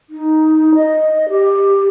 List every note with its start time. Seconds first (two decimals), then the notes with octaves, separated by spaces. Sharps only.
0.10 D#4
0.75 D#5
1.29 G4